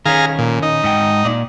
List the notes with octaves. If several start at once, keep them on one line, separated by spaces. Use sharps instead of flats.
D#3 C#4 G#4 F5 A#5
A#2
D#4
G#2 F#5 G5
A#2 D5